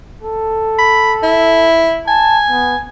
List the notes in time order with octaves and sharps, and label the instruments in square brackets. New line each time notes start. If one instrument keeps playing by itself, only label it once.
[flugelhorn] A4
[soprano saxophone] B5
E4
[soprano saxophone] G#5 [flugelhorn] A5
[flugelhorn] B3